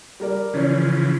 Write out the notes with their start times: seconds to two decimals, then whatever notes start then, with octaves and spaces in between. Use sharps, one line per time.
0.20 G3 A#4 D5
0.54 C#3 E3 F3 C#4 C#5